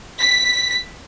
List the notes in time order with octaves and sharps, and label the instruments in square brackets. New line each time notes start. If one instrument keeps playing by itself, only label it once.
[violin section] B6